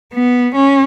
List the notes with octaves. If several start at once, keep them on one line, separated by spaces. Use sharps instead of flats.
B3
C#4